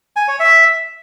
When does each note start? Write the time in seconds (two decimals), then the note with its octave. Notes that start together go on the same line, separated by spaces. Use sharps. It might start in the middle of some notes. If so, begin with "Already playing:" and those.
0.16 G#5
0.28 C#5
0.40 E5